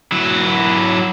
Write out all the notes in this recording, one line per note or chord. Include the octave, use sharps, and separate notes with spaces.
F#3 E4